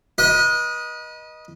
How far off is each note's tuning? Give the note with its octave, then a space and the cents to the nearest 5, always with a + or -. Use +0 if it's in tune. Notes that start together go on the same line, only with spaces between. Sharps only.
B4 -40 D#5 +0